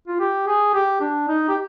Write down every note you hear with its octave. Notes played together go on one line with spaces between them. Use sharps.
F4
G4
G#4
G4
D4
D#4
G4